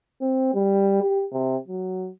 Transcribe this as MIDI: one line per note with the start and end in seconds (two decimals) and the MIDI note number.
0.22 0.50 60
0.55 1.01 55
1.02 1.25 67
1.33 1.56 48
1.68 2.09 54